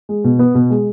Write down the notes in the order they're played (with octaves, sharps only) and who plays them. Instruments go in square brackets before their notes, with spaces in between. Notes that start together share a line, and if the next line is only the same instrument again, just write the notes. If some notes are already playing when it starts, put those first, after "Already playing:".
[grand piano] G#3
B2
B3
B2
G#3